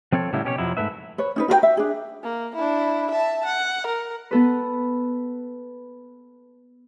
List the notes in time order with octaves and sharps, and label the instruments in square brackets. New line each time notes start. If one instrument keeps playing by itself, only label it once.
[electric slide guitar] F3 C4 A4 C#5
A2 C#3 F#3 G3 E4
B2 C#4 G4 A4 C#5
F2 C3 F3 F#3 E4
G#2 D#3 A3 B4 E5
[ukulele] B4 C#5
C#4 D#4 B4
F#4 A#4 C5 G5
E5
D4 G#4
[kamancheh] A#3
D4 E4
E5 A5
F#5
A#4
[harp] B3 A4 B4